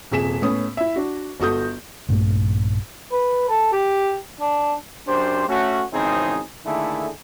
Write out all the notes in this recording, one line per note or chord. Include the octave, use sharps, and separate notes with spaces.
D#1 C3 G#4 B6 E7
A2 B3 C#4 D#6
E4 E5
D4 F#4
G1 F#4 A4 D#6 G6
A#1 G2 A3
B4
A4
G4
D4
F#2 D4 G4 C5
A3 C#4 F#4
G#1 E2 C#3 C4 D#4 G#4
D3 D#3 A3 A#3 E4 G#4